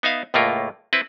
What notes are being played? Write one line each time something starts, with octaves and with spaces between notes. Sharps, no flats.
B3 D#4 E5 F5
C#2 A2 A3 A#3 F4 A#4
C4 E4 B4